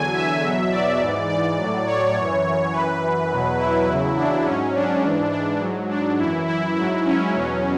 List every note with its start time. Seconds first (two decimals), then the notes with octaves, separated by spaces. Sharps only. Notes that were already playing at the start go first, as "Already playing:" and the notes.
Already playing: E2 D3 F#3 G#5
0.14 E5
0.43 E2 B2 F#3
0.72 D5
1.01 G#2 E3
1.30 D5
1.58 A2 F#3
1.86 C#5
2.16 F#2 E3
2.73 F#2 E3 B4
3.30 E2 B2 F#3
3.59 E4
3.88 E2 C#3 F#3
4.17 D4
4.46 G#2 F#3 C#4
4.75 D4
5.03 G#2 E3
5.33 D4
5.60 G#2 F#3
5.90 D4
6.18 F#2 E3 E4
6.48 E4
6.76 G#2 F#3 E4
7.05 C#4
7.34 E2 B2 F#3